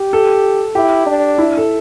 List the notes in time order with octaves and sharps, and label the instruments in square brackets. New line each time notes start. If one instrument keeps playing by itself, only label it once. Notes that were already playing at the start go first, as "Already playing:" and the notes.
Already playing: [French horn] G4
[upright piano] A4
[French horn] E4 [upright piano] G4
[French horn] D4
[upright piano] E4
A4